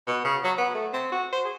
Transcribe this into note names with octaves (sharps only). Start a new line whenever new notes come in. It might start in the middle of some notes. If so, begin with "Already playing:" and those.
B2
C#3
F#3
B3
A3
C4
F#4
C5
G#4